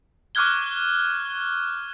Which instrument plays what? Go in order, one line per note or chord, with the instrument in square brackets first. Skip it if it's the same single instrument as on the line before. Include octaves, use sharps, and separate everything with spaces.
[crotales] C#6 D6 F6 F#6 G#6 G7